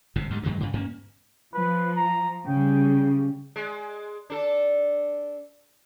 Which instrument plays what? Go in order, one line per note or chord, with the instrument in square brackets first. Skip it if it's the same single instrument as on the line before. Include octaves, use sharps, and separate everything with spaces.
[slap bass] G1 G#2 C3
D2 G#2 G3
G2 D#3 F#3 G#3
G2 C#3
G2 A#3 C#4
[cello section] F3 [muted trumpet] B4
[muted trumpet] A#5
[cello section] C#3 G3 [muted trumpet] G5
[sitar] G#3
D4 A4